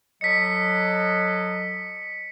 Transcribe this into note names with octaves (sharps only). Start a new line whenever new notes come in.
F#3 A4 D#5 B6 C#7